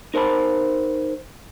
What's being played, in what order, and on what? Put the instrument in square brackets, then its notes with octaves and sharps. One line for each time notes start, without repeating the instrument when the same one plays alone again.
[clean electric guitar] D#4 A#4 C5 A5 B5